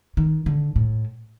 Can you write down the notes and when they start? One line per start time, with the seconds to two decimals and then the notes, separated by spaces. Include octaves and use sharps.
0.17 D#3
0.46 D3
0.76 A2